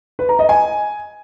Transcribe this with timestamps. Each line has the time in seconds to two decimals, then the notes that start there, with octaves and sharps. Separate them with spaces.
0.19 B4
0.29 A#5
0.39 D#5
0.49 G#5